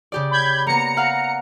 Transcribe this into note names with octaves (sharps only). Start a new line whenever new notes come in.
C#3 G4 D5
B5 G6 G#6
A#3 B3 A#5 C#7
F5 F#5 F6